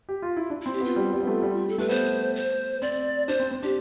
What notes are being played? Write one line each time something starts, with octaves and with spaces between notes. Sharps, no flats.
G4
F4
E4
D4
C4 E4
G4
B3
F4
G3
G3
B3
A3
G3
A4
A3 B4
B3 C5
C5
C4 D5
D4 C5
C4
C4
D4 G4